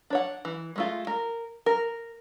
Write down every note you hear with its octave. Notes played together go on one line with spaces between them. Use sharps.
D4 C#5 F#5
E3
G#3 A3 F4
A#4
A#4